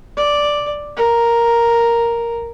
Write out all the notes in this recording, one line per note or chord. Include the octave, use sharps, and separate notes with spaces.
D5
A#4